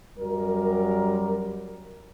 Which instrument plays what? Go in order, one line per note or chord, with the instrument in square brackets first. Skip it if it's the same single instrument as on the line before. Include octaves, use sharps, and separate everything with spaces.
[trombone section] F#2 G3 A#4